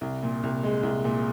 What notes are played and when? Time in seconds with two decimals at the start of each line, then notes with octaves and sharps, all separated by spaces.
0.01 C2
0.23 A#2
0.43 C2
0.63 G#3
0.83 C2
1.05 A#2